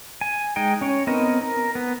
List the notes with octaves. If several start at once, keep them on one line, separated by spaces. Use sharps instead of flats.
G#5
G#3 D#4 G5
C#4 C#5
B3 C4 D#4 A#4 D#5
A#4
B3